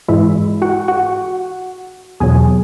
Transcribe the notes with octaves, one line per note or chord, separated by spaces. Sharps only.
G#2 E3 G#3 E4 E5
F#4 F#5
F#4 F#5
E2 B2 F#3 G#4 G#5